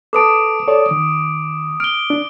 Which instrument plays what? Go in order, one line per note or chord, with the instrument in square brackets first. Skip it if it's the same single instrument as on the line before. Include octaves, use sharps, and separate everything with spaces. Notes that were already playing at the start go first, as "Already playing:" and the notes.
[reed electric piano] A4 B4 A5 [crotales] D6 D#6 D7
[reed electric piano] A4 C#5 D5
D#3
[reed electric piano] F6 [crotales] D7 G7
[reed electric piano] D4